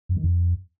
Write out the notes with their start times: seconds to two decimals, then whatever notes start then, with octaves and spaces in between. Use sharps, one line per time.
0.09 F#2
0.17 D#3
0.24 F2